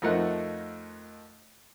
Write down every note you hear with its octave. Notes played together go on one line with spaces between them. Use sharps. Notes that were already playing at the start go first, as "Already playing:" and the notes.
F2 F3 A3 D#4 A#4 F#5